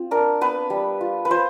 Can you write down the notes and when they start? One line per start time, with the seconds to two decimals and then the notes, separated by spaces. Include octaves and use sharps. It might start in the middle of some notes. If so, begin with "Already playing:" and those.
Already playing: C4 F4
0.11 D4 A#4
0.41 B3 B4
0.70 G3
1.01 F4
1.25 B4
1.31 F4 C5